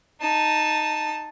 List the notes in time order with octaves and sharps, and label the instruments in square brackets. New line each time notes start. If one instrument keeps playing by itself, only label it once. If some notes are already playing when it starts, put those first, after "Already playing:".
[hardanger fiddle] D#4 A5